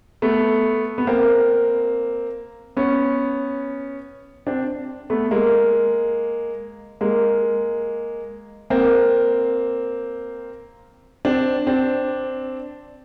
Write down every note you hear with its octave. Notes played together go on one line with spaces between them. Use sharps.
A3 B3
B3
A#3 C4
B3 C#4
C4 D4
A3 B3
G#3 A#3
G#3 A#3
A#3 C4
C4 D4
C4 D4